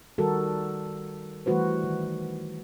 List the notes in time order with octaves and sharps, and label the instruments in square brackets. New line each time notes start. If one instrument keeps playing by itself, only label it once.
[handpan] D#3 G3 F#4 A4 A#4
E3 G3 A3 F#4 B4 C5
D#3